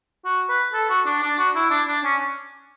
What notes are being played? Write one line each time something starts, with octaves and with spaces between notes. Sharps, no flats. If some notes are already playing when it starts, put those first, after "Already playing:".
F#4
B4
A4
F#4
D4
D4
F#4
E4
D4
D4
C#4